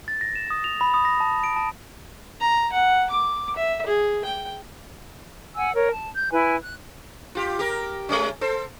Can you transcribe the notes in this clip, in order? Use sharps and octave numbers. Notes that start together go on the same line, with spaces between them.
A6
A#6
E7
D#6
F7
B5
D#6
A#6
A5
D7
A5
A#5
F#5
D6
E5
G#4
G5
F#5 G#5 E6
A#4 C#5
A5
G6
E4 B4 G#5
F#6
F4 G4
G4 A#4
G#3 A3 C#4
A4 C5